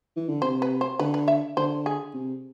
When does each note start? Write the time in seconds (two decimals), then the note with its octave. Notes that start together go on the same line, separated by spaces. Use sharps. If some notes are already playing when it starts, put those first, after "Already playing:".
0.17 E3
0.29 D3
0.42 C3 C5
0.62 B4
0.81 C5
0.99 D3 B4
1.14 B4
1.28 E5
1.57 D3 C5
1.86 G#4
2.14 C3